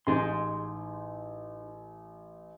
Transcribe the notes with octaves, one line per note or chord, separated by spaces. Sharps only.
A1 D#4 G#4 C6